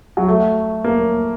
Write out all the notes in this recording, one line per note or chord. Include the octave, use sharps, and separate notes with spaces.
F#3
A3
A#3